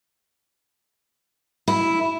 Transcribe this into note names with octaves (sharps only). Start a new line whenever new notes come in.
E4